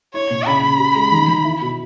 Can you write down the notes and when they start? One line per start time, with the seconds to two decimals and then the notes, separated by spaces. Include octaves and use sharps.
0.14 E4 C#5
0.30 A#2
0.46 C#3 B5
0.63 C#3
0.79 G4
0.96 G#3
1.12 D#3
1.28 D#3
1.44 E4
1.62 B2